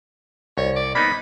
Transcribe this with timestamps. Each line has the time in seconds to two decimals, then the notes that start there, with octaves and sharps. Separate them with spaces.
0.58 C2 C#5
0.76 D5
0.95 A#3 B3 D#4 B5